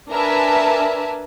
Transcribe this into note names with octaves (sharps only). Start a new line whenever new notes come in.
D4 A#4 B4 E5 G#5 A5